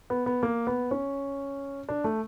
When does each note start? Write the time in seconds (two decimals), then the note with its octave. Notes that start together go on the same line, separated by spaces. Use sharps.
0.10 B3
0.26 B3
0.43 A#3
0.67 B3
0.91 C#4
1.89 D4
2.04 A3